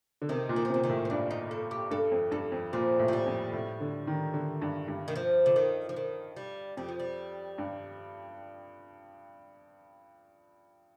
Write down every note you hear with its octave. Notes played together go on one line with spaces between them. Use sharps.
D3
C3 D#3
A#2
D#3
F3
C3 D#3
D#3
A2
C4
G2 D4
D#4
A4
G4
G2 A4
F2
G2 A4
F2
A#2 C4
A2
F3
G3
F2
A2
D3
D#3
D3
G2
G2
D#3
F3
D3
D#3
F3
D#3
G3
F2 G3
F3
G3
G2